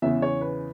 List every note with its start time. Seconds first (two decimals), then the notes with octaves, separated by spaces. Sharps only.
0.02 E2 C#3 E3 E5
0.22 C#5
0.41 B4